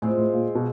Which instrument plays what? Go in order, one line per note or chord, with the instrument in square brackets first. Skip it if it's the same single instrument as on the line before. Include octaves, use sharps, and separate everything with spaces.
[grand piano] A2 [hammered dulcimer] G#3 C4 F4
[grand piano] A2
A#2
B2